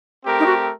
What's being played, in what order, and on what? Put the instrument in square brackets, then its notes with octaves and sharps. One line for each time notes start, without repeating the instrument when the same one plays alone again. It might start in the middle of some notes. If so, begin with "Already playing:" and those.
[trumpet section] A3 C4 G4 A#4
[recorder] D#4
F#4